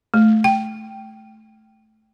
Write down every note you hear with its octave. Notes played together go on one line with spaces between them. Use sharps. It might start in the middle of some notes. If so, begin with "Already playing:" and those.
A3
G5